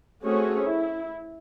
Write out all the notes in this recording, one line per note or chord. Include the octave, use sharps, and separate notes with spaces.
A3 C4 C#4 F#4 G#4 C#5
E4